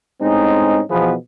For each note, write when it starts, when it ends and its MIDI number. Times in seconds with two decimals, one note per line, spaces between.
0.21 0.81 45
0.21 0.81 56
0.21 0.81 60
0.21 0.81 61
0.21 0.81 63
0.90 1.14 47
0.90 1.14 52
0.90 1.14 53
0.90 1.14 59
0.90 1.14 68
0.90 1.14 71